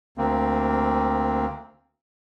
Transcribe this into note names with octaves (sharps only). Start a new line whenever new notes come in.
D2 A#3 C4